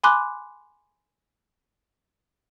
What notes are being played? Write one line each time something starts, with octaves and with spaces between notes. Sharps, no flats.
G#5 B5 C6 D6 F#6